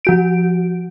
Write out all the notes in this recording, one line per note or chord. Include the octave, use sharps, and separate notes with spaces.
F3 F#4 D7